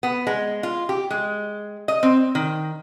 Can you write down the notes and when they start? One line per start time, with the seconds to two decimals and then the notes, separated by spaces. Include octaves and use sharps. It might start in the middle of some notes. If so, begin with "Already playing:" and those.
0.03 B3
0.27 G#3
0.63 F4
0.89 G4
1.10 G#3
1.88 D#5
2.03 C4
2.35 D#3